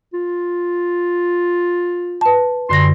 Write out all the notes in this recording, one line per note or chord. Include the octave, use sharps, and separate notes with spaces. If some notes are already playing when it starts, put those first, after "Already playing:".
F4
B4 A5
F#2 D3 C6 A#6